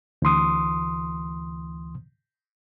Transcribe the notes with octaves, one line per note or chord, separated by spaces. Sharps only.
D2 E3 C6 D#6